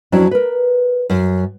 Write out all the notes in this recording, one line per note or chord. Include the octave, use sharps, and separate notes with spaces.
F2 F#3 C#4 D4 E4 A5
A#4 B4
F#2